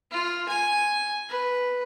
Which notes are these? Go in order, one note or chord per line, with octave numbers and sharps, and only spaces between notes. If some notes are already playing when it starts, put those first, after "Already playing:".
F4
G#5
B4